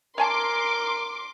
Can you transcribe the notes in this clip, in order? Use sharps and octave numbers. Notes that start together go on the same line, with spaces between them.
A#4 C#5 G#5 A5 C6 D6